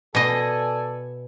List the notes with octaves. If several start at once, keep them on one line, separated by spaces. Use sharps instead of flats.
B2 A4 D5 D#5 G#5